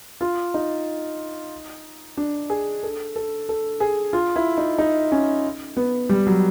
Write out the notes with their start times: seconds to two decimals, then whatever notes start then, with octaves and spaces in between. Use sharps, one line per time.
0.21 F4
0.54 D#4
2.17 D4
2.50 G#4
2.83 A4
3.16 A4
3.49 A4
3.80 G#4
4.13 F4
4.36 E4
4.58 D#4
4.79 D#4
5.12 C#4
5.77 B3
6.09 G3
6.27 F#3